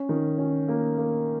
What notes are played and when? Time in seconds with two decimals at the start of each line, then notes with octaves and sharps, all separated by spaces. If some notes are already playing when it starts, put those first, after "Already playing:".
Already playing: C#4
0.09 D#3
0.38 C#4
0.68 A#3
0.98 A#3